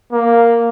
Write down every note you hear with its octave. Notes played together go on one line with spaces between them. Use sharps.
A#3